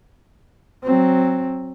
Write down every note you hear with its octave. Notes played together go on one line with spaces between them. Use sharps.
F#3 C4